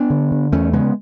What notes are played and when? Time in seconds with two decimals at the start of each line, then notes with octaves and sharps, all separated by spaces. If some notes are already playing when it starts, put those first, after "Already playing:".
Already playing: B3 D4
0.10 D3
0.31 D3
0.52 E2 A3 C#4
0.73 C#3 G#3 B3